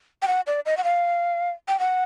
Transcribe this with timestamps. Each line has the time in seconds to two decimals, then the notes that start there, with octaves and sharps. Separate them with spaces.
0.22 G5
0.28 F#5
0.47 D5
0.66 D#5
0.77 F#5
0.84 F5
1.68 G5
1.79 F#5